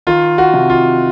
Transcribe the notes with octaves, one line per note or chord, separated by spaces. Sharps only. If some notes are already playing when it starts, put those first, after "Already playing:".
D#3 F4
F#4
C3
F4